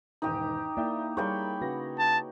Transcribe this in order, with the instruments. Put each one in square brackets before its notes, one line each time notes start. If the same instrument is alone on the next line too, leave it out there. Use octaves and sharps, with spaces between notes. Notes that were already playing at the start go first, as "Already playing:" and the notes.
[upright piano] E1 G#2 D#3 [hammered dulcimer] D#4 G4
[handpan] A#3 E4 [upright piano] D5 E5 G5
[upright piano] G3 A#3 F5 [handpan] G#4 [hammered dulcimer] C#5 G5 B5
[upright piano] C#3 A#6 [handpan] F#4 B4
[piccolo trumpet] A5